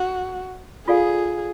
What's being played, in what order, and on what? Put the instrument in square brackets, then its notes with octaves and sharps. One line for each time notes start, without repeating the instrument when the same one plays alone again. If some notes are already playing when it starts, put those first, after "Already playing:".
Already playing: [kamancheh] F#4
[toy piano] F4 A4 D5 F5 G#5 [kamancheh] G#4